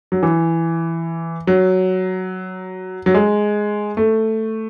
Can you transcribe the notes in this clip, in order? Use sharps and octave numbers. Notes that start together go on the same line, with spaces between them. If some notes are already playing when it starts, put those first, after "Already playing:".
F#3
E3
F#3
F#3
G#3
A3